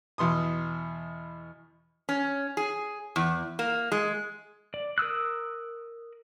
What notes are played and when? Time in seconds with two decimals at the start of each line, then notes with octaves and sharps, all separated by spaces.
0.18 E2 B2 C6 D#6
2.09 C#4
2.57 G#4
3.16 E2
3.59 A#3
3.92 G#3
4.74 D5
4.98 A#4 D#6 E6 F#6